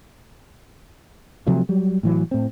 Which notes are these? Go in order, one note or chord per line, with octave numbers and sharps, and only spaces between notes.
C3 F3 F#3 A3
F#3 G3
A2 E3 F#3
A2 C4